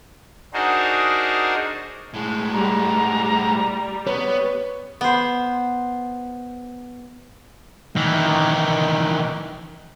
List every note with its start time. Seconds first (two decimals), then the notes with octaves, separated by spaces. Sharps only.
0.54 D4 D#4 F#4 G#4 A#4 C5
2.14 A2 G#3
2.53 G3 A#5
4.07 B3 C#5
5.01 B3 C5
7.96 D#3 E3